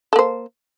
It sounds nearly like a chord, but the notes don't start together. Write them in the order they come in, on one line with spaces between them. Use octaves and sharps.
A4 A#3 C5